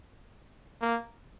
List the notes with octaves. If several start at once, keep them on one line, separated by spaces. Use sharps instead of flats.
A#3